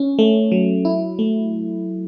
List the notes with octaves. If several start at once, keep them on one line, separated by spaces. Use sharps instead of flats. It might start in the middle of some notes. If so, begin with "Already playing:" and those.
Already playing: C#4
A3
F#3
E4
A3